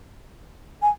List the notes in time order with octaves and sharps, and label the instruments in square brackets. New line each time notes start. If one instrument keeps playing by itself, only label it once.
[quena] G#5